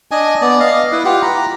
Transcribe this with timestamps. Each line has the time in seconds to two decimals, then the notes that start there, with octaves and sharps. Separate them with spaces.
0.11 D4 D#5 G#5
0.41 B3 D5
0.60 D#5 F5
0.92 E4 B4
1.05 F4 G4 F#5
1.22 A#5 B5